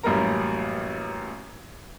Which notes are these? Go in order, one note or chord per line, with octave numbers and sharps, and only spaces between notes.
A1 F#2 G3 A#3 A#4 A#5